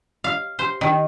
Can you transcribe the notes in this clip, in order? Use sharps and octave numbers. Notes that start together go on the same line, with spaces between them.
F5
C5
D#3